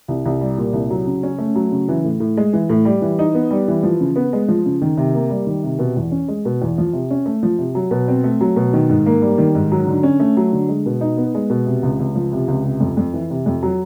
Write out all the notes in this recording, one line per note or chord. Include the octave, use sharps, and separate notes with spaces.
C2
C2
G3
A#2
C2
F#3
C#3
C#4
A3
F#3
C#3
E3
A2
A2
G#3
E3
A2
G3
E3
D#4
B3
G3
E3
F3
C#3
B3
G#3
F3
C#3
D#3
C3
A#3
G3
D#3
C3
B2
E2
C#4
G#3
B2
E2
F3
C3
C#4
A3
F3
C3
F#3
B2
C4
A3
F#3
B2
D#3
G#2
A#3
G3
D#3
G#2
F#3
D3
C#4
A3
F#3
D3
G#3
B2
D#4
B3
G#3
B2
C3
C#2
C#2
F3
C3
C#2
C3
F2
F2
E3
C3
F2
F#3